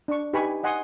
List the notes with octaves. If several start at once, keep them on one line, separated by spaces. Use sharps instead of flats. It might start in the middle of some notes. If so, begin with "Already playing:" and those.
D4 C#6
D#4 G4 B4 G#5 B5 C#6
D#5 F#5 G#5 C6 D#6